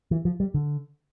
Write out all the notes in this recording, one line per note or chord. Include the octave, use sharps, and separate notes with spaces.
E3
F3
G3
D3